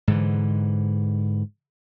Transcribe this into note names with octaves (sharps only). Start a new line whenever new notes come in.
G#2 D3 E3